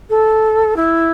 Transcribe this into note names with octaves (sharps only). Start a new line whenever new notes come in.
A4
E4